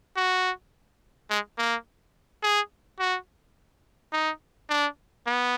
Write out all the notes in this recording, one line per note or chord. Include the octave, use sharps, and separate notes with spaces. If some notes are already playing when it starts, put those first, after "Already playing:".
F#4
G#3
A#3
G#4
F#4
D#4
D4
B3